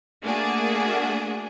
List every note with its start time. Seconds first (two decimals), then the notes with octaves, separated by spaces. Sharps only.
0.23 A3 A#3 D4 F#4 G#4